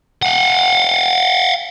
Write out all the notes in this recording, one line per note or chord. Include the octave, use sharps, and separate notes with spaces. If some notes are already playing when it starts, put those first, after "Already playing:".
F5 F#5